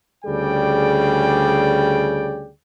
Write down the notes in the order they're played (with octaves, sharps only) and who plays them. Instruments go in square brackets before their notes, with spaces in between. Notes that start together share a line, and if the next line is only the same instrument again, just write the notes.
[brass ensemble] D2 C#3 G3 G#4 D5 G5